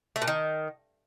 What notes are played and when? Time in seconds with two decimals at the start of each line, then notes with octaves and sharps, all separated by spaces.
0.16 A3
0.22 A#2
0.28 D#3